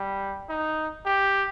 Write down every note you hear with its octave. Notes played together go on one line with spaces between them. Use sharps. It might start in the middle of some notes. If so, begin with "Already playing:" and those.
Already playing: G3
D#4
G4